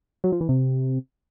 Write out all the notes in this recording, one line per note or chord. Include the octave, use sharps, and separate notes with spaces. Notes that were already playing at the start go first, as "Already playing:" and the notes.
F#3
F3
E3
C3